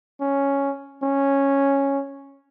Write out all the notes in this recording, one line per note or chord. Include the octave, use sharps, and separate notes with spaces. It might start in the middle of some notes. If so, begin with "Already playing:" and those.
C#4
C#4